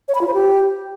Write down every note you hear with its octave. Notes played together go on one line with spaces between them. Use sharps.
C#5
B5
F4
C5
G4